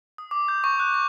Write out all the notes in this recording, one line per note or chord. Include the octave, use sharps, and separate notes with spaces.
D#6
D6
G6
C#6
F#6
C#6